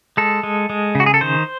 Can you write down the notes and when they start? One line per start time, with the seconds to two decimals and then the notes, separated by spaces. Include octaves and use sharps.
0.17 G#3 A4
0.43 G#3
0.70 G#3
0.95 C#3
1.00 F#4
1.06 G#4
1.14 A4
1.21 D#3 C5